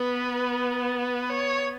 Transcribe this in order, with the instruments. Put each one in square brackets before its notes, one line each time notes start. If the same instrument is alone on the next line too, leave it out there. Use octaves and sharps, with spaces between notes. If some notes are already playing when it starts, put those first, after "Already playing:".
Already playing: [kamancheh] B3 [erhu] B4
[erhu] B4
C#5